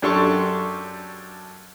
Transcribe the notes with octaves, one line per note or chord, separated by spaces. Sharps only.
F#2 D4 G4 A4 C6 C#6